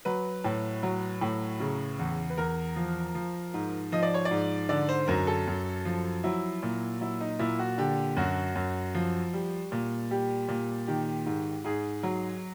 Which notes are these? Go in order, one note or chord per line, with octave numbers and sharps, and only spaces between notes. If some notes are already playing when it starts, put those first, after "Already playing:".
F#3 B4
A2
F#3
A2
C#3
E2
B4
E2 A#4
F3
F3
G#2
F3 D#5
D5
C#5
D5
G#2
D3 D5
C5
F#2 A#4
A4
F#2
F3
F#3 E4
A#2
F#3 E4
D#4
A#2 E4
F#4
D3 G4
F#2 F#4
F#2
F3
G3
A#2
G3 G4
A#2
D#3 G4
G#2
G#2 G#4
F#3